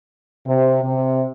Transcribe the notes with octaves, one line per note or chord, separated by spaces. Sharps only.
C3
C3